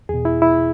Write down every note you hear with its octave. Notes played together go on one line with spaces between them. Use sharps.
E2 B2 G#4
E4
E4